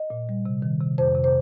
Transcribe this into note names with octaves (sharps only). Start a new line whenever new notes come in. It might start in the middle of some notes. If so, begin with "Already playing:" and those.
Already playing: D#5
A#2
G3
C3
D#3
C3
F2 C5
C3
C5